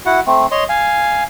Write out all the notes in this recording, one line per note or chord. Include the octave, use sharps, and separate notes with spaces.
E4 F#4 F#5
A3 C4
C#5 D#5 C6
F5 G#5